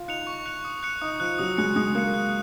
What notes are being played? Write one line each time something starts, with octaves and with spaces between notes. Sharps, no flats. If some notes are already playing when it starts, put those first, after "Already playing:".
Already playing: F4
D#4 F#6 C#7 F7
C#6
F#6 C#7 F7
D#6
F#6 C#7
D#4 D#6
F3 F#6
C#7
F#3 D#6
G#3 F#6 C#7
G#3 D#6
A#3 F#6 C#7
F#6